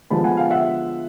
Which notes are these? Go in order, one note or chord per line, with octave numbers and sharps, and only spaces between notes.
D3 F3 G#3 B3 A5 B5
F#5 G#5
F5 G5
E5 F#5